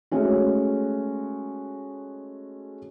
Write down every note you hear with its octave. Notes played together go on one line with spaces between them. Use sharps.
G#3 A3 C#4 F#4